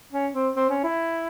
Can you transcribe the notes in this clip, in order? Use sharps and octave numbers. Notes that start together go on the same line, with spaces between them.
C#4
C4
C4
C#4
E4